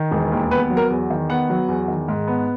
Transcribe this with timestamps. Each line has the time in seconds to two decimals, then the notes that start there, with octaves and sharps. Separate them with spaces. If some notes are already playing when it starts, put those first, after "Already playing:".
Already playing: D#3
0.11 E1
0.32 D#2
0.51 B3 B4
0.70 F#3
0.77 A#4
0.90 E2
1.10 D#3
1.30 B3 F#5
1.50 F#3
1.69 E2
1.88 D#3
2.09 G#2
2.27 B3